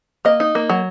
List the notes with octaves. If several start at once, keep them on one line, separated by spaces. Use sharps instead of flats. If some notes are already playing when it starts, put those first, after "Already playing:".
A#3 D#5
D#4
A#3
F#3